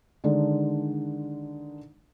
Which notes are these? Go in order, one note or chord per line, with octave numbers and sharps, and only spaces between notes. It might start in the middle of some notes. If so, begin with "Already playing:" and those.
D3 D#3 G#3 D4